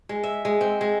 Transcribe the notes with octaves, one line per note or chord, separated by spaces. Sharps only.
G#3
E5
G#3
C4
G#3